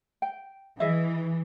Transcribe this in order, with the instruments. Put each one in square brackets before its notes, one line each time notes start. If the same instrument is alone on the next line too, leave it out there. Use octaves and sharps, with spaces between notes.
[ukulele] G5
[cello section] E3 [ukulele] G#4 D#5 E5